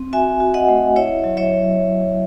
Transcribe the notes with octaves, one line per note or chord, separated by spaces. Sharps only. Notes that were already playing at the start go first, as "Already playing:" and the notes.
Already playing: C4
F#4 E5 G#5
F#4
D#5 F#5
A3
E4 C#5 E5
F#3
C#5 E5
F#3